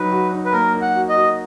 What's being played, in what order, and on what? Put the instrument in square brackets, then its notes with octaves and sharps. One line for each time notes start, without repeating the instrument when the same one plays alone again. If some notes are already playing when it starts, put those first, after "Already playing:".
Already playing: [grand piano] F#3 D#4 [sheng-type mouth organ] B4
[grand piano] F#4
D#4
[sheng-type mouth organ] B4
[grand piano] A#3 [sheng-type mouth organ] A#4
[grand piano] D#4
[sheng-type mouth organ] F#5
[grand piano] F#4
[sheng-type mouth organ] D#5
[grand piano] F#4